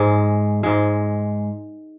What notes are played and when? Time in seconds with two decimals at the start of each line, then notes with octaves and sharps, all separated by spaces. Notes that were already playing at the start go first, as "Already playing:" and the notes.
Already playing: G#2 G#3
0.63 G#2 G#3